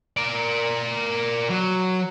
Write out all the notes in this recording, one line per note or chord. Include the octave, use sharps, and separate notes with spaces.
A#4 D5
F#3